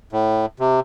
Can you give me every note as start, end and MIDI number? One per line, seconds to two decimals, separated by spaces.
0.13 0.46 45
0.59 0.80 48